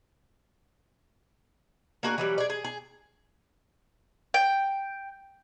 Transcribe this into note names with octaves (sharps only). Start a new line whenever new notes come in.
A#3 D4 F#4 G#4
E3 F#3 G3
G#4 D5
G#4
G#4
G5